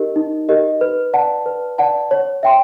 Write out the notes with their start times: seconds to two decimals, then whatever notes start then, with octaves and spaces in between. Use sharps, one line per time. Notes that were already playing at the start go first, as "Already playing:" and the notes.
Already playing: D#4 G4 A#4 D#5
0.16 D#4
0.49 G4 A#4 D#5
0.81 B4
1.13 D5 F#5 A5
1.46 B4
1.78 D5 F#5 A5
2.11 C#5
2.43 E5 G5 C6